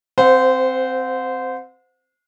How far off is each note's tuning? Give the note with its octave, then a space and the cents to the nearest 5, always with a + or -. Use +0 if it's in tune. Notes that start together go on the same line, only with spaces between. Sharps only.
C4 +0 C5 -20 F#5 -40